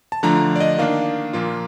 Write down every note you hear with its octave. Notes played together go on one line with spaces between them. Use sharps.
A5
D3 F3 A3 D4 A#5
D5
D#5
D#3 A#3 D4 F5
A#2 F3 A#3 F4